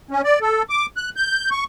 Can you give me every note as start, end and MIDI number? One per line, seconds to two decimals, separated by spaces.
0.11 0.21 61
0.24 0.39 74
0.41 0.63 69
0.70 0.86 86
0.97 1.10 90
1.16 1.50 91
1.51 1.64 85